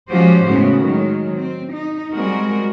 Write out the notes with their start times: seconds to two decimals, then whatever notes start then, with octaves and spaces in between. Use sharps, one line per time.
0.10 F3 G#3 C#4 F#4 G4 C5
0.46 A2 C#3 G#3 B3 F#4
0.81 D#3 F#3 G#3
1.34 C4
1.73 D#4
2.12 G3 G#3 C4 F#4 A#4